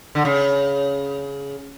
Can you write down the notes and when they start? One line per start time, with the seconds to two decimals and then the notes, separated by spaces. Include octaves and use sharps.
0.15 D3
0.25 C#3